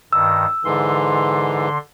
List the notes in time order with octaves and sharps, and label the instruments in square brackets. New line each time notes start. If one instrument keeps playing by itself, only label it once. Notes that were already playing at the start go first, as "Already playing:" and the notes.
[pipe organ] G2 D#3 [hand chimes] E6
[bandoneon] G#2 E3 [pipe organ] D3 C6